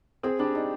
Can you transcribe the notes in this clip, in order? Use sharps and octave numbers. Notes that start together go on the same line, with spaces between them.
C4 G#4
G3 D4
D4 D#4